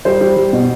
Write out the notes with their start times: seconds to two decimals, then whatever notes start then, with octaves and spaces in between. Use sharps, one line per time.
0.05 G3 C5
0.21 G3
0.37 G3
0.53 B2